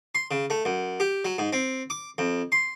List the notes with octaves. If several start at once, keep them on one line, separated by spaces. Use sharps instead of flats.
C6
C#3
A3
F#2
G4
F#3
G#2
C4
D6
F2
C6